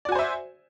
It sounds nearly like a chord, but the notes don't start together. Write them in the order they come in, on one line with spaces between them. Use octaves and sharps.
D5 F#4 G#5 C5 E5